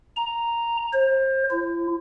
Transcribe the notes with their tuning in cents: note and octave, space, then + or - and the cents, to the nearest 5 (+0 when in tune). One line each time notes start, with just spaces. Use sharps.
A#5 +0
C5 +30
E4 +45